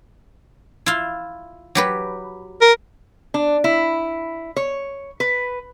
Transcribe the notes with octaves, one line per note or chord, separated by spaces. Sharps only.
E4 F4
F#3 G4 B4
A#4
D4
E4
C#5
B4